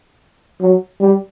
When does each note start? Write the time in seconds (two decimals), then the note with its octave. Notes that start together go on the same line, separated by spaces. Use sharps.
0.61 F#3
1.00 G3